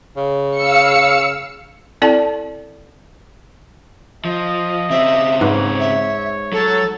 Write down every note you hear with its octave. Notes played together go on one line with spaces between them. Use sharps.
C#3
F5 E6 C#7
C4 E4 A4 D5 G5 A5
F3 D#5
C#3 C4 E5
G#2 B4 C#5
E5
F#3 A4